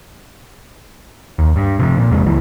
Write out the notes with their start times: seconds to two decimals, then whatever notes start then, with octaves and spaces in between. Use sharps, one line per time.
1.39 D#2
1.56 G2
1.79 C3 D#3 F3
1.97 A#2
2.11 E2 C3 G#3
2.26 C#2 E3